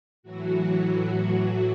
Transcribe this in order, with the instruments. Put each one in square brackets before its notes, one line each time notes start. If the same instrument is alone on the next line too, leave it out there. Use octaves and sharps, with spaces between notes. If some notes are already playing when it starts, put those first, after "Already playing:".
[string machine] A2 E3 F#3 F#4